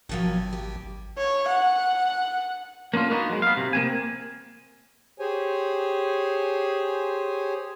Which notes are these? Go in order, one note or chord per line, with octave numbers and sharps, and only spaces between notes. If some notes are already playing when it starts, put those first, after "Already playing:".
G#1 B2 F3 F#3
G4
C#5
F#5
A#3 C#4 D4 F4
A#3 B3 D#4 F#4
F#3 G#3
B3 F5
C3
A#3 C4 G#5
G4 G#4 C5 C#5 G#5